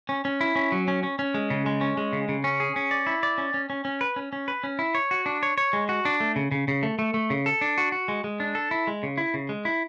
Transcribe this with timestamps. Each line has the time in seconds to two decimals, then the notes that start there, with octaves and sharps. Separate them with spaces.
0.09 C#4
0.25 C#4
0.41 E4
0.56 C#4
0.72 F#3
0.88 C#4
1.03 C#4
1.19 C#4
1.34 G#3
1.50 C#3
1.66 G#3
1.81 C#4
1.97 G#3
2.13 C#3
2.29 C#3
2.44 C#4
2.60 G#4
2.76 C#4
2.91 D5
3.07 E4
3.23 D5
3.38 C#4
3.54 C#4
3.70 C#4
3.85 C#4
4.01 B4
4.16 C#4
4.33 C#4
4.48 B4
4.64 C#4
4.79 E4
4.95 C#5
5.11 F#4
5.26 D4
5.43 C#5
5.58 C#5
5.73 G#3
5.89 F#4
6.05 D4
6.20 A3
6.36 C#3
6.51 C#3
6.68 C#3
6.83 A3
6.99 A3
7.14 A3
7.30 C#3
7.46 A4
7.61 D4
7.78 F#4
7.92 F#4
8.08 G#3
8.24 G#3
8.40 D4
8.55 A4
8.71 E4
8.87 G#3
9.03 C#3
9.18 E4
9.34 C#3
9.49 G#3
9.65 E4